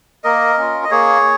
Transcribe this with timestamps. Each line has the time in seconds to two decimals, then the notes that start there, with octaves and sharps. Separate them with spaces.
0.24 A#3 A#4 D#5
0.58 C#4 F4
0.84 D#5
0.91 A#3 G#4 C#5